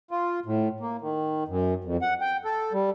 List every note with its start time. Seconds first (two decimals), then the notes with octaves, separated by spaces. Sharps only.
0.11 F4
0.46 A2
0.80 A#3
1.01 D#3
1.48 F#2
1.84 F2
2.02 F#5
2.21 G5
2.45 A4
2.73 G3